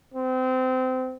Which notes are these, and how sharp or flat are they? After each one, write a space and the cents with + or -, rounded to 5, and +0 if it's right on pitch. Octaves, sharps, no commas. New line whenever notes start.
C4 -25